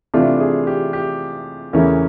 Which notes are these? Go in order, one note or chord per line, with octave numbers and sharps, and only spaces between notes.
C3 E3 A3 D4 F4
G#4
G4
G4
E2 C#3 E3 A3 C#4 A#4